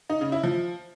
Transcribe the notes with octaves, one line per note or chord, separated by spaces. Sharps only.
D#4
C#3
E4
F3